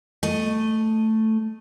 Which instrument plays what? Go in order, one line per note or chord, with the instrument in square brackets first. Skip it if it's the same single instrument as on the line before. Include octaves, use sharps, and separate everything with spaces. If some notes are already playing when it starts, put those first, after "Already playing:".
[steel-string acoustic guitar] A3 D#5